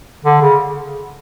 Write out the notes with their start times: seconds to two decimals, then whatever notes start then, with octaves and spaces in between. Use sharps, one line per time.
0.24 D3
0.42 C#3